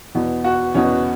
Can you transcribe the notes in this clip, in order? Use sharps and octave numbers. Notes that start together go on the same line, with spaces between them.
E2 B2
F#4
E2 B2 C#4